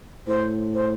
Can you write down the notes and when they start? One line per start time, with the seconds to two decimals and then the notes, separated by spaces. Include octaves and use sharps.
0.27 A2 C5
0.74 C5